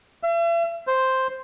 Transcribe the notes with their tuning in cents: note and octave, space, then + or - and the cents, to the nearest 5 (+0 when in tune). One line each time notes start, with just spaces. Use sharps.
E5 +40
C5 +0